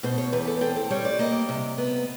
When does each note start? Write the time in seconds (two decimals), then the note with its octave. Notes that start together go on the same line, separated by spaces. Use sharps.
0.03 B2 C5
0.18 C#5
0.32 E2 B4
0.47 A4
0.61 C4 A4
0.76 A4
0.90 G3 C#5
1.05 D5
1.19 A#3 D#5
1.49 C3
1.78 B3